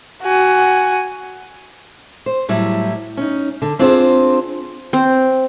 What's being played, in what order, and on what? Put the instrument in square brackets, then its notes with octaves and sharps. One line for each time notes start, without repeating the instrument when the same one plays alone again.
[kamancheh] F#4 G#5
[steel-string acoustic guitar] C5
A2 F#3 G3 E4
C#4 D#4
D3
C4 D4 F4 G#4 C5
[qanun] C4